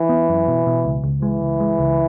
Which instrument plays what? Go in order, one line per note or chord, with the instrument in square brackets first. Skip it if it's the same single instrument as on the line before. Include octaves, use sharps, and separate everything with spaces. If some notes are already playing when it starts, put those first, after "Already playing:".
Already playing: [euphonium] E3
[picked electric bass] B3
F#2
B2
B2
C#2
C#2
[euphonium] E3 [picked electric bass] G#3
[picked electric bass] C#2
G#3
C#2